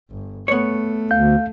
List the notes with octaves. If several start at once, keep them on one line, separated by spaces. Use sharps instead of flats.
G1
A3 B3 C#5
D2 F5 G6